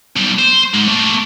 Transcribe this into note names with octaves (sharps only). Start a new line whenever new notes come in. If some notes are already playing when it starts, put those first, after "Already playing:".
B1 G3
C5
G#2
A3 A#3